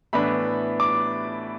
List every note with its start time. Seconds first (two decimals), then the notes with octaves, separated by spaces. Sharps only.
0.13 A2 E3 B3 D4 B5
0.80 D6